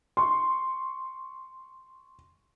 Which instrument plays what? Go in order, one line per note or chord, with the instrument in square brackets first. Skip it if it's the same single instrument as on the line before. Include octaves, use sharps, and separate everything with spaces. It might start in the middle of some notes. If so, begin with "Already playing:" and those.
[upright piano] C6 C#6